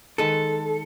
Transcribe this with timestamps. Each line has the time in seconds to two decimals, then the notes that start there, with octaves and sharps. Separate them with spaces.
0.18 D#3 G#3 A4 B4